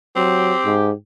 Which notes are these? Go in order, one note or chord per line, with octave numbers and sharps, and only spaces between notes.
F#3 C4 G4
G#2